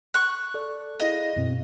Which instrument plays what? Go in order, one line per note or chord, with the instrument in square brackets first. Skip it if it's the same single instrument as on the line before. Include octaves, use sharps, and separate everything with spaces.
[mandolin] C#6 F#6
[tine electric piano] A4 D5
[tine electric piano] E4 G#4 F5 [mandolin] D#5
[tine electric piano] F#2 B2 C4